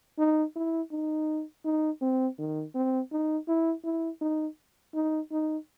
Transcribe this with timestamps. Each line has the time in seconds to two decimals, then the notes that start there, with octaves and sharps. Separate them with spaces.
0.18 D#4
0.56 E4
0.91 D#4
1.65 D#4
2.01 C4
2.38 D#3
2.75 C4
3.12 D#4
3.48 E4
3.84 E4
4.21 D#4
4.94 D#4
5.32 D#4